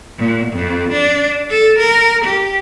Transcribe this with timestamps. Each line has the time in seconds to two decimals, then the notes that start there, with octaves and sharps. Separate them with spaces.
0.19 A#2
0.52 F2
0.92 D4
1.50 A4
1.79 A#4
2.25 G4